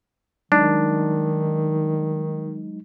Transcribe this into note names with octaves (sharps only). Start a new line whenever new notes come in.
D#3 F#3 G#3 D4 D#4